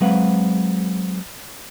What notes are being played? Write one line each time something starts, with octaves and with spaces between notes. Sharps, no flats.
F#3 G#3 C4 B4 F5 F#5